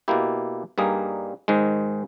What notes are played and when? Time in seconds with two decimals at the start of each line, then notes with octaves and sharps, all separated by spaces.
0.08 B2 A#3 E4 G4
0.78 G2 G3 A#3 D#4 G#4
1.48 G#2 D#3 G#3